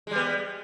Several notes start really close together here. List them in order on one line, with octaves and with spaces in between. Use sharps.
G#3 G3 B3